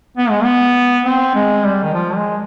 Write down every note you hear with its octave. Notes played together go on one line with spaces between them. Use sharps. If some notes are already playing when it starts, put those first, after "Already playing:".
B3
G#3
B3
C4
G#3
G3
D#3
F3
G#3